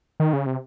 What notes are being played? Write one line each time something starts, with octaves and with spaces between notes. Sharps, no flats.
D#3
C#3
C3